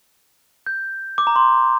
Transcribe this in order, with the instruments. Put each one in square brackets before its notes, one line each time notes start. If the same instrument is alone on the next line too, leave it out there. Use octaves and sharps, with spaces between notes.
[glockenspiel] G6
D6
A#5
C6